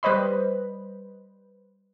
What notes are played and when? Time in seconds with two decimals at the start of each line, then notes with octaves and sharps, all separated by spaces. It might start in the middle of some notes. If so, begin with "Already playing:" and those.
0.03 G3 B4 C5 D#5 B5